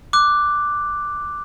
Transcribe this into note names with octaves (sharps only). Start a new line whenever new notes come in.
D6 F#6